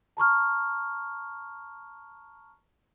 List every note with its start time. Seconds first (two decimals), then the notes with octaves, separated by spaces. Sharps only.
0.17 A5 A#5 C#6 F6